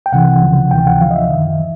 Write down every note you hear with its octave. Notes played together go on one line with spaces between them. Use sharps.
G5
C2 C3 E3 F#5
C#2 C#3 F3
D2 C3 E3 G5
F#5
D2 D3 F3 F5
D#5
E5
F#2 D#3
E3